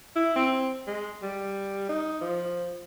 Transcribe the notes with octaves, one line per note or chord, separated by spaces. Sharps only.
E4
C4
G#3
G3
D#4
F3